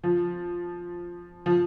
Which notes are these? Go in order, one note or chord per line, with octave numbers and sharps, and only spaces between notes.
F3
F3